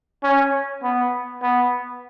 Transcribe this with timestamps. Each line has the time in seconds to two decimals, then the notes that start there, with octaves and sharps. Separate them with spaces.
0.23 C#4
0.83 B3
1.43 B3